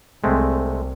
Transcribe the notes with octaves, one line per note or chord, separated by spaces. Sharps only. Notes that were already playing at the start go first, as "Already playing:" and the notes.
C2 G#3 A3 C4